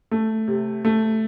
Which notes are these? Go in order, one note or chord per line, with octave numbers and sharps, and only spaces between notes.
A3
C3
A3